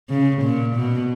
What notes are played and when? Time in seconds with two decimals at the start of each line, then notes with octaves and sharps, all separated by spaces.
0.09 C#3
0.42 A#2
0.76 B2